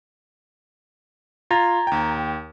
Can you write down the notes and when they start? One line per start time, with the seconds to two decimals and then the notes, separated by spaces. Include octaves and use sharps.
1.51 F4 A#5 G#6 A6
1.87 D#2 G5